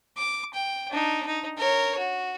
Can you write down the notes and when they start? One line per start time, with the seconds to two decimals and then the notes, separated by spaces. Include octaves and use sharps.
0.17 D6
0.54 G5
0.90 D4 D#4
1.26 D#4
1.58 A#4 C#5
1.98 F#4